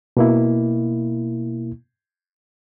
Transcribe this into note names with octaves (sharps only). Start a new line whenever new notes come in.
B2 A#3 E4